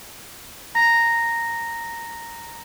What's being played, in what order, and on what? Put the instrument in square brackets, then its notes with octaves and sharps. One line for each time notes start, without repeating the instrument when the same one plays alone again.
[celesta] A#5 A#6